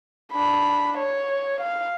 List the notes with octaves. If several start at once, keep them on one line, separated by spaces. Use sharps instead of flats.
D4 B5
C#5
F5